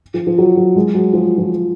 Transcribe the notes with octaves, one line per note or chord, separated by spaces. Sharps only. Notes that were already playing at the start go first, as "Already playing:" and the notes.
F3
F3
F#3
F#3
G#3
F#3
F3
F3